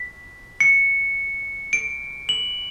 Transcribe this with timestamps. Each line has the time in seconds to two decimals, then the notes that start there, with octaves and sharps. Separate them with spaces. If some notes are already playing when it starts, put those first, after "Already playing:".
Already playing: B6
0.60 C#7
1.73 D7
2.29 F#7